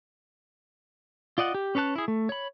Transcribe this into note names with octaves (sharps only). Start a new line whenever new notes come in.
F4 D5 D#5 F#5
G4
C#4 B4 C#5 A5 F#6
E4 G#4
A3
C#5 B5